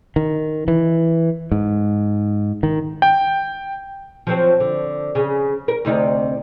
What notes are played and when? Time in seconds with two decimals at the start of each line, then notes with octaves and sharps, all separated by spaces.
0.16 D#3
0.68 E3
1.52 G#2
2.63 D#3
3.02 G5
4.27 F3 F#3 C4
4.60 D3
5.15 C#3
5.68 A#4
5.85 D2 C3 D#4